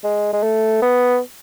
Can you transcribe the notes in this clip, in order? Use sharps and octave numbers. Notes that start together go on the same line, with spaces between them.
G#3
G#3
A3
B3